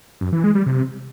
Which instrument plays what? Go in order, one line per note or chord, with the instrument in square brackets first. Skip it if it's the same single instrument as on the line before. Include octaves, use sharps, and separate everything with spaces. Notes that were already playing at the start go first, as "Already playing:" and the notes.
[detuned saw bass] F#2
E3
G#3
G3
C3